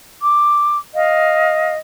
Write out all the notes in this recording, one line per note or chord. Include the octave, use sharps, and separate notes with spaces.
D6
D#5 F5